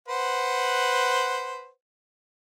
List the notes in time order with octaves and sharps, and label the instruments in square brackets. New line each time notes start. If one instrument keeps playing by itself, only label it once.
[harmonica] B4 C5 F#5